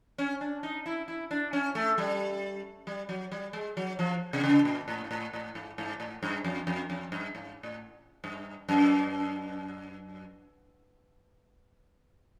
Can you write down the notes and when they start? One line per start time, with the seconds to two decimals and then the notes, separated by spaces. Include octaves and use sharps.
0.18 C#4
0.41 D4
0.63 D#4
0.86 E4
1.08 E4
1.31 D4
1.53 C#4
1.75 A3
1.98 G3
2.87 G3
3.09 F#3
3.32 G3
3.53 G#3
3.77 F#3
3.99 F3
4.33 C3
4.44 C#3
4.65 A#2
4.88 A2
5.04 G#2
5.11 A2
5.33 A2
5.55 G#2
5.78 G#2
6.00 A2
6.23 G2
6.44 F2
6.67 F2
6.90 F2
7.12 G2
7.35 G#2
7.63 A2
8.24 G2
8.69 F#2